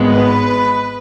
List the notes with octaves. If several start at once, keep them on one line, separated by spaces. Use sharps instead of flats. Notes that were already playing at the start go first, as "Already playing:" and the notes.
Already playing: G#1 G#2 G#3 B3
B4